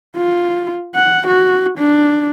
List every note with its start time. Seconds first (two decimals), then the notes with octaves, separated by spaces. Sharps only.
0.17 F4
0.95 F#5
1.27 F#4
1.78 D4